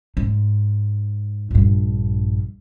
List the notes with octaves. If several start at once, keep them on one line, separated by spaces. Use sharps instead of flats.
G#2
A#1 G2